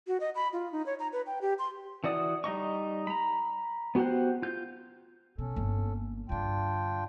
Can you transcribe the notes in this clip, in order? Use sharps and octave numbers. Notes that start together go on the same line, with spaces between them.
F#4
D#5
B5
F4
D#4
C#5
A#5
B4
G5
G4
C6
E3 F#4 D5 D#6
G3 D#4 D#5 C#6
A#5 B5
B3 F#4 G4 C5 F#5
F4 G6
B2 C#4 A4
G1 A#3
G2 D3 D4 F4 G5